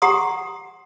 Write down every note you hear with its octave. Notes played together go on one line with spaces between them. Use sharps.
G4 G#4 F#5 A#5 C6 D#6